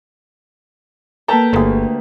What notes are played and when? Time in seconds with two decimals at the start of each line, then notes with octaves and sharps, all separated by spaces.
1.28 A#3 A4 B4 G5 A5 A#5
1.53 G1 D2 A3 G4 G#4